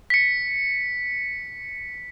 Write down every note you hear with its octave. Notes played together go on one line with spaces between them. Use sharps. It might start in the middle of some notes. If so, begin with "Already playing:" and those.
B6 C#7